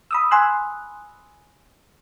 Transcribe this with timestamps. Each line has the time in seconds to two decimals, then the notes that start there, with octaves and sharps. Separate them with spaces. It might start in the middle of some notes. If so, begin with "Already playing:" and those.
0.11 B5 D#6 E6
0.31 G#5 B5 C6 E6 F#6